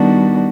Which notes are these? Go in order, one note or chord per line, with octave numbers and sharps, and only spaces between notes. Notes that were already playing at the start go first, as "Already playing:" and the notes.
Already playing: D#3 G3 B3 D4 F#4